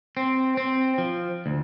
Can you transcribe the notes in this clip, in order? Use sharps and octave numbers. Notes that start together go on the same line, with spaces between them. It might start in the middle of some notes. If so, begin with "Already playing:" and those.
C4
C4
F3
D2